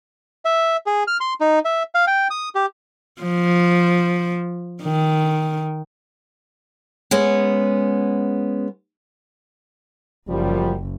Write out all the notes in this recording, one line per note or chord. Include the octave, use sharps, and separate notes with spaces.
E5
G#4
F6
C6
D#4
E5
F5
G5
D#6
G4
F3
D#3
G#3 B3 C#4
F#1 F#2 F3 G3